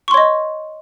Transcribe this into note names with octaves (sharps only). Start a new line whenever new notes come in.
C#5 D#5 C6 C#6